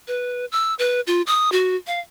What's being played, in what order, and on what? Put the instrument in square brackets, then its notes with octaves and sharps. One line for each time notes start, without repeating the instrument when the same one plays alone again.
[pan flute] B4
E6
B4
F4
D#6
F#4
F5